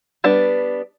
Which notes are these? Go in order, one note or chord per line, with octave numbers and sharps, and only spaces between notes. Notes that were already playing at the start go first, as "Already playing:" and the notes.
G3 B3 D4